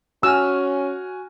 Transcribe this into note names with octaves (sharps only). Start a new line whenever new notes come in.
C#4 F#4 G#5 E6 F6